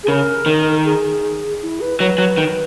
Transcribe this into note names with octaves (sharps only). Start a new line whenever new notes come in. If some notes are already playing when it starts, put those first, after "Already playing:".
G#4
C#3 A#4
D#3
G#4
E4
B4
F#3 B4
F#3
D#3